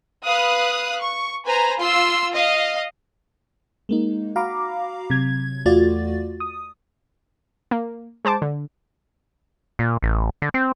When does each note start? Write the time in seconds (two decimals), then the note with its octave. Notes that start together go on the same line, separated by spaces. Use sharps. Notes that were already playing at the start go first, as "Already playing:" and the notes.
0.25 B4 F5 D#6 F#6
1.01 C#6
1.44 B4 C5 G#5 A#5
1.77 F4 C6 E6
2.33 D#5 F5
3.89 G#3 A#3 D#4
4.36 F#4 F5 A#5 B5 D6
5.10 C3 F#3 G#6
5.65 E2 A3 F4 F#4 D5 A6
6.40 D#6
7.71 A#3
8.25 G#3 C5 A5 D6
8.42 D3
9.79 A#2
10.03 A1
10.42 D3
10.54 C4